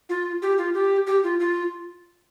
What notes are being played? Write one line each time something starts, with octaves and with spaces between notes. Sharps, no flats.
F4
G4
F4
G4
G4
F4
F4